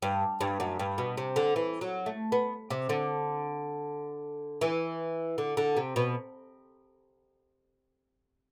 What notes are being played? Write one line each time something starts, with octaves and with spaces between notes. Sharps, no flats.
G2
G2
F#2
G2
B2
C3
D3
E3
F#3
A3
B3
C3
D3
E3
D3
D3
C3
B2